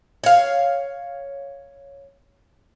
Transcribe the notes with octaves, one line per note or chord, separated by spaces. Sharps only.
C#5 F5